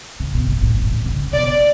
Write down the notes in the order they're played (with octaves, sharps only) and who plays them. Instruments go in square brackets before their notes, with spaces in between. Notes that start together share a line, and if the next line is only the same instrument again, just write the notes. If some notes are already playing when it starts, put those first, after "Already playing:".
[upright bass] C#3
B2
A2
A2
F3
D3
C#3
[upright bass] B2 [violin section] D5